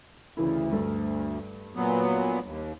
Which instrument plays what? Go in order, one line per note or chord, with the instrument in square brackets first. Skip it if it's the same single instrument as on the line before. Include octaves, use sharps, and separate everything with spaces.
[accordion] D2 [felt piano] C#3 E3 E4
[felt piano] G2 A3
[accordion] A#2 F#3 B3
D#2